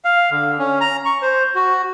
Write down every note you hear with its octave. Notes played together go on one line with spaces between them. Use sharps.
F5
D3
C#4
A#5
C#6
C5
F#4